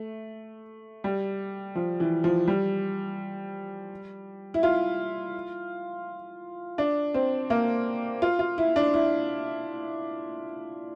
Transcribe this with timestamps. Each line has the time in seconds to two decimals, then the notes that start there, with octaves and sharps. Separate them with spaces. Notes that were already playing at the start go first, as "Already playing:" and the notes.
Already playing: A3
1.04 G3
1.75 F3
2.00 E3
2.24 F3
2.48 G3
4.54 E4
4.63 F4
6.78 D4
7.14 C4
7.50 A#3
8.22 F4
8.39 F4
8.58 E4
8.76 D4
8.94 E4